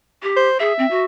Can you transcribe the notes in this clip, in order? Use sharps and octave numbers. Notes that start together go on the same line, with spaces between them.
G4
C5
G#4 E5
C4
F#4